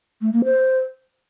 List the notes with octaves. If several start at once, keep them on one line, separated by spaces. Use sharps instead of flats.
A3
A#3
C5